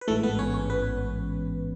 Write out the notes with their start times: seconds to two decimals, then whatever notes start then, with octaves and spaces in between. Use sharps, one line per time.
0.01 B4
0.08 A1 G#2 E3 G#3 A3 A4
0.23 B3 B4
0.39 C#4 C#5
0.54 C#4 C#5
0.70 B3 B4